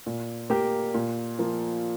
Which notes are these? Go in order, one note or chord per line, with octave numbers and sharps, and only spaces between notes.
A#2
A#3 G4
A#2
F3 A#3